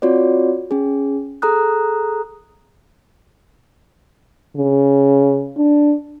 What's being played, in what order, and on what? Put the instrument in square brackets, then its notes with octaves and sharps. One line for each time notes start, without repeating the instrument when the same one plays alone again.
[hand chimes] C4 F4 F#4 C#5 D5
C#4 G#4
G#4 A4 A#5 D#6 F#6
[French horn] C#3
D4